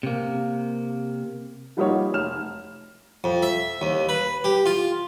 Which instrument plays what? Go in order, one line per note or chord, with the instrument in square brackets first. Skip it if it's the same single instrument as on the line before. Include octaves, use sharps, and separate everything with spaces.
[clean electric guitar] C3 A#3
[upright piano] F3 G3 A#3 D#4 F#4 C#5
F1 F6 E7
[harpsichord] F2
E5
D#2
B4
G4
F4